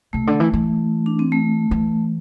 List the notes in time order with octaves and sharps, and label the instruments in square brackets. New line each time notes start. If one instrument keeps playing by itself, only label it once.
[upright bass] C3 [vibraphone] A3
[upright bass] D3
E3
E3
[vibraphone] D4
C4
A3
[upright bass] E3